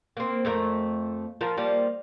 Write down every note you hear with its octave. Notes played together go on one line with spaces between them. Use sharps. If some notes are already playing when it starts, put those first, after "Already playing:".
A#3 C4
F2 A3 A#4
F3 F4 A#4
F3 G3 A#3